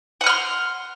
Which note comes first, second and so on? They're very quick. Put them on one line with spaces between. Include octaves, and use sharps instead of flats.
F#5 D#6 F6 C6